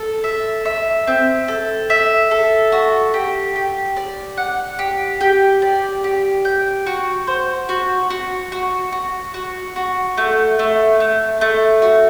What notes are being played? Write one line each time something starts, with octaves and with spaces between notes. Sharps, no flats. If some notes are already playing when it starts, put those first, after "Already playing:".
Already playing: A4
E5
E5
C4
A4
E5
A4
F#4
G4
G4
D5
F#5
G4
G4
D5
G4
G5
F#4
C5
F#4
F#4
F#4
F#4
F#4
F#4
A3
A3
A3
A3
F#4